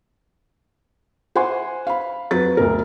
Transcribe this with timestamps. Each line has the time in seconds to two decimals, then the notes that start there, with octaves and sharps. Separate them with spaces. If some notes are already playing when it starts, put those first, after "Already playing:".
1.35 C5 E5 F#5 G#5 C6
1.87 F5 B5
2.31 F2 F#3 B4 A6
2.57 D2 B2 A#4